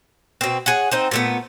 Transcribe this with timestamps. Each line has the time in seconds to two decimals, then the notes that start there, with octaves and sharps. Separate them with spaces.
0.41 B2 C4
0.66 G#4 C#5 F#5
0.91 C4 D#4 C5
1.11 A#2 A3 B3